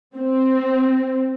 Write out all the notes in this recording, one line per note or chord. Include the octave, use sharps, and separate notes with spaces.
C4